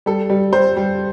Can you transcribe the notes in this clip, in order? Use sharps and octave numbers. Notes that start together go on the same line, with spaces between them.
G3 A4
G3
G3 C5
G3